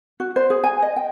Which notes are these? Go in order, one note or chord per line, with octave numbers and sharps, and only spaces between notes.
F#4
C5
G#4
G#5
D#5
G5